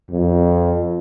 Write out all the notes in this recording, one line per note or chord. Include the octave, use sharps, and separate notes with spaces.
F2